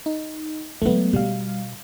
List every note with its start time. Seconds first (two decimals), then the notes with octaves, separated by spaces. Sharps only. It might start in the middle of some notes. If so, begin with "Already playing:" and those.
0.06 D#4
0.82 F#3 G#3 A3 B3
1.13 B2 G3 F5